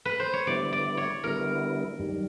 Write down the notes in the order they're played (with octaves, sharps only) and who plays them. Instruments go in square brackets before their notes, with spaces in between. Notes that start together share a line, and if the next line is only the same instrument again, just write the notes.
[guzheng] B4
C5
C#5
[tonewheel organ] D3 G3 B3 E4 [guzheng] D5
[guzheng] D5
C#5
[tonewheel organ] D3 G3 B3 E4 [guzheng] A#4
[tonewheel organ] F#2 D#3 G3